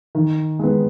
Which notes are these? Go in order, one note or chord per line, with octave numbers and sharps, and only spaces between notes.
D#3
G#3 B3